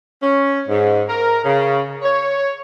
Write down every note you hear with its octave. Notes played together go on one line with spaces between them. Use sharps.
C#4
G#2
A#4
C#3
C#5